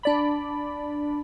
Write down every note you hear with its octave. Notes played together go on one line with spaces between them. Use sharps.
D4 D5 B5